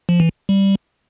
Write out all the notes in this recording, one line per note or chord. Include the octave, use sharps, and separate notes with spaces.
F3
E3
G3